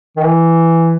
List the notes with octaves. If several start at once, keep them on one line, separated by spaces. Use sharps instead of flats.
D#3
E3